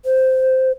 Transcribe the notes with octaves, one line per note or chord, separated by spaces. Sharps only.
C5